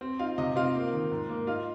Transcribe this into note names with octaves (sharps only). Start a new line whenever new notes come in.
C4
D#4 F4 F5
C3 D#4 D#5
C4 F4 F5
A#3
D#3
G#2
A#3
D#4 F4 F5